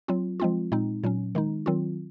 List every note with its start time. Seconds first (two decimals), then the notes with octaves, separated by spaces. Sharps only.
0.08 F#3 C4 F4
0.40 F3 G#3 C4 F4
0.72 A#2 G#3 C4 D#4
1.04 A#2 F#3 C#4
1.35 D#3 G#3 D#4
1.66 D#3 F#3 C4 F4